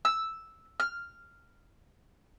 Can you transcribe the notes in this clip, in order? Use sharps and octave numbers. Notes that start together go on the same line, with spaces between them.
E6
F6